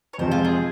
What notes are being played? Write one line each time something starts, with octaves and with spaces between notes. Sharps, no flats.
C#5
F2 C3 F3 G#3 C4 C5
F4
G#4